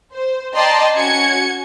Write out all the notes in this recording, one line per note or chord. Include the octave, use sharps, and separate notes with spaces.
C5
D5 D#5 G5 A5 A#5 C6
C#4 F#4 G#6 C#7